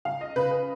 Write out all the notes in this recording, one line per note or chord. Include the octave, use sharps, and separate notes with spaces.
C#2 F5
D#5
C#3 B4
B4